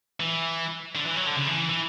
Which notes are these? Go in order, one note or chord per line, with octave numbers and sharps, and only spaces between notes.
E3
D3
E3
F#3
D3
C#3
E3
E3